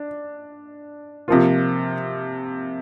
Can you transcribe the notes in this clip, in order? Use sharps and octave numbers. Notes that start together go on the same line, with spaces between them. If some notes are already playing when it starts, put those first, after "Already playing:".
Already playing: D4
C3 F3 A#3 F4